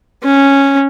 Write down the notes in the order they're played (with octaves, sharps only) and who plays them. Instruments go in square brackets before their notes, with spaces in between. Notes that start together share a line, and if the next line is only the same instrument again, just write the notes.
[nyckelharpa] C#4